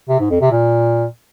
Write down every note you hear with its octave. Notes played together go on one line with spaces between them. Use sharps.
C3
G#2
F2
C3
A#2